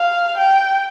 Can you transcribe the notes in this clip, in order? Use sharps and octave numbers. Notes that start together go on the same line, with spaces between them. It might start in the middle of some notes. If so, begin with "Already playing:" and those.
Already playing: F5
G5